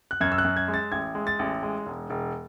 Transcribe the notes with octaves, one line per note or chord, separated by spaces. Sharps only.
F#6
F#2 G#6
E6
F#6
F#2
G#6
G#3
A6
A1 G#6
G#3
A6
A1
G#3
E1
E1